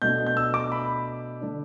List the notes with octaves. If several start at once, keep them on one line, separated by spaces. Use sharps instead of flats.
B2 A3 D4 G6
G6
E6
D6
B5
D3 A3 D4